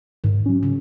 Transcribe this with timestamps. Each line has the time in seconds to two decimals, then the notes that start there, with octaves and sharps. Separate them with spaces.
0.24 G#2 D#3
0.46 F#3 C#4
0.63 C#3